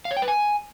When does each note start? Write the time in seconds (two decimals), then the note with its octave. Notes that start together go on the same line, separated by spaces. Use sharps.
0.05 F5
0.11 C#5
0.17 G5
0.22 B4
0.28 G#5